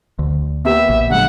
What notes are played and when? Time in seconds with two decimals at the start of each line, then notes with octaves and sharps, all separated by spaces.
0.19 D2
0.65 A#3 B3 G4 E5
0.89 A#1
1.10 D3 F#3 G#3 F#5